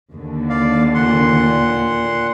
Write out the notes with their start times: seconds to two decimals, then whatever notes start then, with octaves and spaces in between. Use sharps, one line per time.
0.12 D#2 D3
0.49 D5 F5
0.94 A#2 F#5 C6